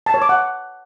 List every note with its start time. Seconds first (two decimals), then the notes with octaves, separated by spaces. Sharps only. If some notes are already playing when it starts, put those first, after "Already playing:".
0.06 A5
0.14 C#5
0.22 D6
0.29 F#5